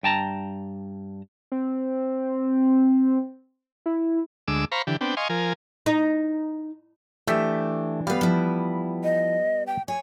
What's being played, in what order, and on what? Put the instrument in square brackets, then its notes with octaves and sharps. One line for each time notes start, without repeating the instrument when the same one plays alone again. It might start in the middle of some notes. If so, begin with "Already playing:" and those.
[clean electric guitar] G2 G5 A5 A#5
[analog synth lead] C4
E4
[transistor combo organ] D2 G#3 D6 E6
C5 F5 A#5 B5 C#6
D3 E3 G4
B3 C4 D4 G5
D#5 F5 G#5 C6 C#6
F3 A#4 G#5
[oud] D#4
[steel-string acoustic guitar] E3 D4 [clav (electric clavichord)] A3 G4 E5
[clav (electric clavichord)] G3 B3 [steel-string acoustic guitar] B4 F5
[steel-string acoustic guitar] F3 E4
[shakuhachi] D#5
G5
[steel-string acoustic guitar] C#5 [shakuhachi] G#5